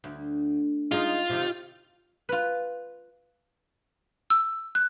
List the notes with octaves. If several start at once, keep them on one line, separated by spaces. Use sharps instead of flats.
D2
G#3 D#4 F4
C3 D#3
F4 B4
E6
F#6